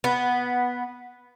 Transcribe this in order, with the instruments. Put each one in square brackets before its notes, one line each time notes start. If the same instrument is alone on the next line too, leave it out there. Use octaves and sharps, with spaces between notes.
[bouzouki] B3